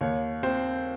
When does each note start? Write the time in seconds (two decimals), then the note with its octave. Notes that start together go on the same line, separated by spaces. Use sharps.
0.01 D#2 C#5
0.43 C4 C5